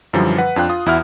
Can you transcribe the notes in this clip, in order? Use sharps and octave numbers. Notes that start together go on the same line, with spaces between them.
F#2 D3 E3 F3 G3
B4 F#5
F2 D4 F4 G5 F#6
F4 D#6
E2 E4 F#4 E5 F#5 F6